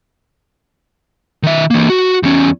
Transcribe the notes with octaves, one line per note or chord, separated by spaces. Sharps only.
D#3 E5
E3 A#3
F#4
E2 C#4